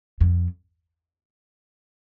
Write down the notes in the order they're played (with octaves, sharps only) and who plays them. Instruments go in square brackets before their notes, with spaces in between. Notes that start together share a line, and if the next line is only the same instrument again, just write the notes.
[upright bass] F2